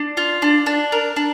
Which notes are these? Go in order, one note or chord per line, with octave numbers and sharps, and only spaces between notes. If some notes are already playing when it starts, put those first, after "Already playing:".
Already playing: D4
F4
D4
D4
A#4
D4